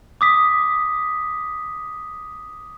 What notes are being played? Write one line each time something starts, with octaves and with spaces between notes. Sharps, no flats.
D6 D#6 B6